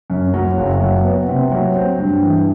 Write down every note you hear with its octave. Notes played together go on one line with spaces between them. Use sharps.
F#2
F#3
F#1
F#3
B3
C3
F#3
C4
G2
E3